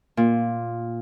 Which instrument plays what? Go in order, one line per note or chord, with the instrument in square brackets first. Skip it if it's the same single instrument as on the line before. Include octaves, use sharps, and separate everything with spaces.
[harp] A#2